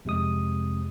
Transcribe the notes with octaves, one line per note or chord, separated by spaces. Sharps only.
F2 C3 G#3 D#6